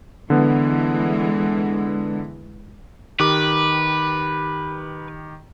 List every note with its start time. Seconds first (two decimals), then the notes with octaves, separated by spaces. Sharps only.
0.30 D3 E3 G#3 B3
3.20 D#3 G4 B4 D6